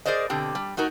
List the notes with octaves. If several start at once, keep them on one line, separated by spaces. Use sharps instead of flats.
G#4 A#4 C5 D5 D#5
B2 D3 C4 G4
G3
A3 D#4 F#4 A#4